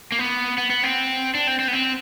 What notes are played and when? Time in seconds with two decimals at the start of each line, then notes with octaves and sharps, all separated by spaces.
0.12 A#3
0.19 B3
0.58 B3
0.70 B3
0.83 C4
1.35 D4
1.47 C4
1.59 C4
1.68 B3
1.73 C4